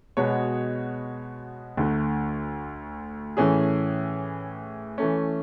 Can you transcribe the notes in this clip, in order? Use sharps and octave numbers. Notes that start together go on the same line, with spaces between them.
B2 G#3 B3 F#4 C#5
D2 D3 A3
A2 E3 A3 C#4 G#4
E3 A3 C#4